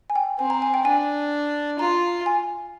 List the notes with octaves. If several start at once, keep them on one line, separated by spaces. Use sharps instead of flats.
G#5
G5
C4 G#5
A#5
G#5
G5
D4 G#5
F4 A#5
G#5